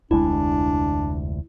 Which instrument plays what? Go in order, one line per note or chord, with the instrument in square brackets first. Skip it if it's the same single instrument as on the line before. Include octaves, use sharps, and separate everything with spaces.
[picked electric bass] F1 D2 G#3 [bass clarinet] D4 [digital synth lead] E4